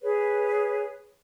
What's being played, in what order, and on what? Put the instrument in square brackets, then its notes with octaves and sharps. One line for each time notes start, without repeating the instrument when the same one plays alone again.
[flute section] G#4 B4 C#5